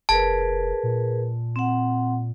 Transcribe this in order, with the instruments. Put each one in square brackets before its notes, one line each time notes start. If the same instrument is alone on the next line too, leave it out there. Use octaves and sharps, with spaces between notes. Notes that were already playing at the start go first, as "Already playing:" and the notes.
[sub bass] F1 [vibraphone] G#4 A#4 B4 [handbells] A5
[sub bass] A#2
[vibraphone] C4 F#5